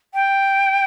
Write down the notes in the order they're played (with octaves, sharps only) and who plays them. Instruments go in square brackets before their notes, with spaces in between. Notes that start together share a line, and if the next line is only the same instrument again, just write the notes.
[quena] G5